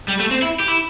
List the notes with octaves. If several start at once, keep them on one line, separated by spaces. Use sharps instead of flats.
G3
A3
C4
E4
G4
E4